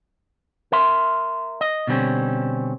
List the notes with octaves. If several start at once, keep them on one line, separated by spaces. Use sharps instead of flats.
A#4 E5 C6
D#5
B2 D3 G3 C4 C#4